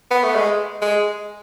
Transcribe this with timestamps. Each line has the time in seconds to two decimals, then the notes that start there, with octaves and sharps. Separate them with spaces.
0.11 B3
0.23 A3
0.35 G#3
0.82 G#3